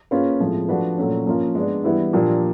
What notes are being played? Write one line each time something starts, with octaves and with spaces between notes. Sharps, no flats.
A#3 C#4 F4 G#4 B4
A2 F3 G#3 C4
F3 A3 D4 F#4 B4
A#2 F#3 A3 C#4
F3 A#3 C#4 F4 A#4
G#3 B3 D4
E3 G3 B3 E4
A#2 F3 A#3 D4 G4